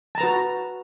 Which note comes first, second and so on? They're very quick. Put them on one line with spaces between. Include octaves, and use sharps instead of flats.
A5 A#5 B4 F#4